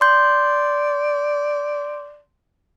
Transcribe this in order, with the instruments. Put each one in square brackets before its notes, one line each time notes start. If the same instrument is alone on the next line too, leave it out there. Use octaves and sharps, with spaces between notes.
[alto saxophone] D5 [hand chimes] C6 G6